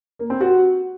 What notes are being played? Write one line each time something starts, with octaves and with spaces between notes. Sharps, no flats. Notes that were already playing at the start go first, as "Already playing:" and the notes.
A#3
C4
F#4